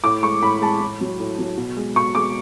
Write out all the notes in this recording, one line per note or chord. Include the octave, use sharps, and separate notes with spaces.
A2 D6
G#3 C#6
A2 B5
G#3 A5
A2
F#3
A2
F#3
B2
G#3
B2 C#6
G#3 D6